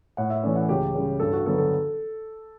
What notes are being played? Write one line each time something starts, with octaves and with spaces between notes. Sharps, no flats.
A2 F#5
E5
E3 A3 C#4 D5
F#5
C#2 G4
C#3 G3 C#4
G2 A4
F#4
D3 F#3 B3 A4
A4